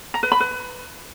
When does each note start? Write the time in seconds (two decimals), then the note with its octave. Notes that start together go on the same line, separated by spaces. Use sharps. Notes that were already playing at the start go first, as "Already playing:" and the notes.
0.14 A#5
0.23 B4
0.32 B5
0.40 B4